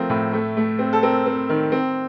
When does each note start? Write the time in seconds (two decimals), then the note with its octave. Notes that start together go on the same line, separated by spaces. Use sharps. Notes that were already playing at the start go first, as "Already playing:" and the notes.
Already playing: F3 A3 C4 A#4
0.10 A2
0.33 A3
0.57 A3
0.79 C4
0.93 A4
1.03 C4 A#4
1.26 C4
1.49 D#3
1.72 C4